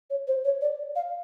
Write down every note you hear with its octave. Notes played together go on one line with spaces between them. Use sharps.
C#5
C5
C#5
D5
F5